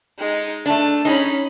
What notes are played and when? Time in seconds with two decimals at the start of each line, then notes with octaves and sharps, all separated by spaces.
0.19 G#3 D#4
0.66 A3 D4 A5
1.05 C#4 D#4 G#4 B5